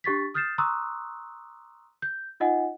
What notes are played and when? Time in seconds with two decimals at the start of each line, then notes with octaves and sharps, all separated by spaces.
0.04 D4 G4 C#6 A6 B6
0.34 D#6 F6 G6 A6 C7 E7
0.58 A#5 C6 C#6 D#6 E6 F#6
2.02 G6
2.40 D#4 F4 D#5 F#5 G#5